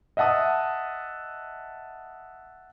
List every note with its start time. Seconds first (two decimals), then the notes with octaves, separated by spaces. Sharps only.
0.17 D#5 E5 F#5 A5 D#6